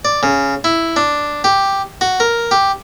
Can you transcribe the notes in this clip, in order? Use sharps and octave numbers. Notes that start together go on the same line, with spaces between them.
D5
C#3
E4
D4
G4
F#4
A#4
G4